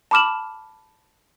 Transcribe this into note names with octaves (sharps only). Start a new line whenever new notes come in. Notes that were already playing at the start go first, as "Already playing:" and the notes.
A5 B5 D6 F6 E7 F#7